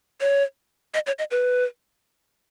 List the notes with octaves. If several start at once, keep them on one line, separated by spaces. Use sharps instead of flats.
C#5
D#5
C#5
D#5
B4